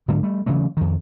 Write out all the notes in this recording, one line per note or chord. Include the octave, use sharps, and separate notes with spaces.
G#2 D3 F#3 G3
G3 A3
C#3 E3 F#3 A3
F2 D#3